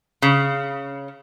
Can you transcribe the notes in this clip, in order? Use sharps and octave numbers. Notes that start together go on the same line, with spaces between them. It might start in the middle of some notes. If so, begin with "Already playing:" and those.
C#3